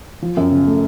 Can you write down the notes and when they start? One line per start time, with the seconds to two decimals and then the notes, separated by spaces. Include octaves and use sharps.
0.22 F3
0.37 F#2
0.52 C#3
0.67 A3